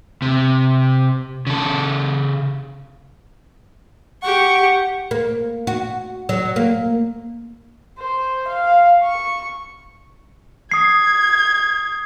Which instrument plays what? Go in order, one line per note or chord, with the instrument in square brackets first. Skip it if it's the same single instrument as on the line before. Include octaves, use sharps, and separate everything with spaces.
[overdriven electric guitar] C3
C#3 A4
[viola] G4 C#6 [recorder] F#5
[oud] A#3
F#4
F#3
A#3
[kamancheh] C5
F5
C#6
[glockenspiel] D#6 C7 [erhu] G#6